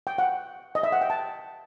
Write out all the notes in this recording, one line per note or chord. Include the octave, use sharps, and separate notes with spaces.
G5
F#5
D#5
E5
F#5
G5
A5